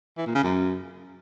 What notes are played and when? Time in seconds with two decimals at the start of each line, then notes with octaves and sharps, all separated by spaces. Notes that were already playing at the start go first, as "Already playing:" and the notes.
0.18 E3
0.26 A#2
0.35 C#3
0.44 F#2